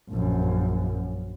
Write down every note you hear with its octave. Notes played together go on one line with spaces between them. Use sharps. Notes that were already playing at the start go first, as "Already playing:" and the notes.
A#1 F#2